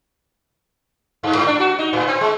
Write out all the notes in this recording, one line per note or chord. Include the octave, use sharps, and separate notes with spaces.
G2
G#2
D4
F#4
D#4
A2
C4
G#3